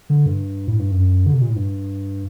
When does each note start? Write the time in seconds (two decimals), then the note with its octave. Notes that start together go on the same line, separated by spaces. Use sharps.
0.10 D3
0.26 G2
0.68 A2
0.79 G2
0.91 F#2
1.26 D3
1.34 C3
1.41 A#2
1.49 A2
1.56 G2